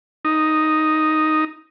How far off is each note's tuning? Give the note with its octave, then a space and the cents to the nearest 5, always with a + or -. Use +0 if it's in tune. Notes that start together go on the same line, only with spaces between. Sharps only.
D#4 +0